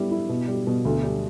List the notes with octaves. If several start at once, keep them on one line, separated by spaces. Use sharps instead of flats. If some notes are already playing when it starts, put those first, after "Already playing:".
Already playing: G3 B3 E4
E4
B2
G3
B2
D2
G3